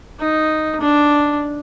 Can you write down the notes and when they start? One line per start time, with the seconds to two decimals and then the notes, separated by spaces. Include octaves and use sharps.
0.20 D#4
0.81 D4